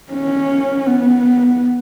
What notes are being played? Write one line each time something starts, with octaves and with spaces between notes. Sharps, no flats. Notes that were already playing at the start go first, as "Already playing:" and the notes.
C#4
B3